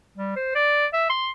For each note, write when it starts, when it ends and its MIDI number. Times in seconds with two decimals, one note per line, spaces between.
0.17 0.34 55
0.36 0.52 72
0.55 0.86 74
0.93 1.07 76
1.10 1.28 84